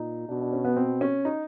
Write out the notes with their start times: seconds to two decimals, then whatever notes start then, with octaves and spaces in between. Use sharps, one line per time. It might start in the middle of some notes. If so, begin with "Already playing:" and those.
Already playing: A#2 D#4
0.29 B2 D4
0.41 D4
0.53 C#4
0.64 B3
0.76 C4
1.01 C#4
1.25 D#4